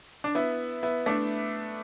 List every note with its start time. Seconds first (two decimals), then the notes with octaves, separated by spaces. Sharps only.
0.24 D4
0.35 B3 E4
0.83 B3 E4
1.06 A3 D4